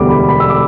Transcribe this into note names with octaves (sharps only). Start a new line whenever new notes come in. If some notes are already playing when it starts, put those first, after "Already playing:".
Already playing: E1 D2 D3 G3 D6
B5
B5
E6
D6